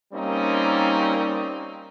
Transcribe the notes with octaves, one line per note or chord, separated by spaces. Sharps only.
G3 A#3 C4 C#4 D#4